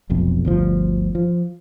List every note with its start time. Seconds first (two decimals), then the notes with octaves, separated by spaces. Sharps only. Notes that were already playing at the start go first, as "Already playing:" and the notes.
0.10 F1 B1 F2
0.45 G1 D2 F3
1.15 F3